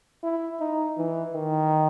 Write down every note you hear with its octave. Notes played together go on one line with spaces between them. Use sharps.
E4
D#4
E3
D#3